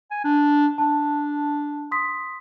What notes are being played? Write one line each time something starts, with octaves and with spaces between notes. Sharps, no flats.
G#5
D4
D4 A5
C6 D#6 B6